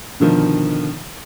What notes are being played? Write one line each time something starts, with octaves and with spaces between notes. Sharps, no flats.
B2 D3 D#3 F3